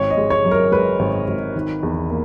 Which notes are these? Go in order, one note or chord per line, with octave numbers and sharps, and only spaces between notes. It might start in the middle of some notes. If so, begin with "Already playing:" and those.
Already playing: G#1 C#5
D#5
G#3
C#5
F#2
A#4
G#3 B4
G#1
G#1
D#3
E2
A#3